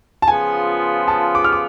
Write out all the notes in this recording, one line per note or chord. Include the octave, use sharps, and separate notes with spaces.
A5
C#3 F3 B3 F4 G#4 G#5
A5
D6
F6
D6